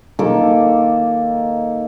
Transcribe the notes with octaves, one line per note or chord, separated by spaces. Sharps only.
D#3 A#3 A4 D6